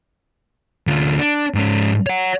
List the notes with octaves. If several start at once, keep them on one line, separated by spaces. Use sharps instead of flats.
D2 F4
D4
G#2 C#4
C#5 F#5